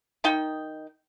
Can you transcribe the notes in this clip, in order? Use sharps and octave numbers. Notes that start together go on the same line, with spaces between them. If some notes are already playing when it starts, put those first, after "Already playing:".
D#3 D#4 G5